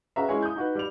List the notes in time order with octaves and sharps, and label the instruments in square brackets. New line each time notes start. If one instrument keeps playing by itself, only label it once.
[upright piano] C#4 F#4 G#4 B4 E5 A#5
G#3 C#4 E4 C#5 G#5
D#6 G6
D#4 F#4 B4
G3 D5 F7